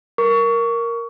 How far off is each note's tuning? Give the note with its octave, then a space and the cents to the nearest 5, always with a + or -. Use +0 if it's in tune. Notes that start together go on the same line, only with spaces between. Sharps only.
A#4 +0 C#6 +25